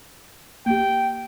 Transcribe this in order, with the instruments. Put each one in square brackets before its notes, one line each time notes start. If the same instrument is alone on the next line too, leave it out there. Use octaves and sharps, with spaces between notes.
[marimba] A#3 G4 [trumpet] G5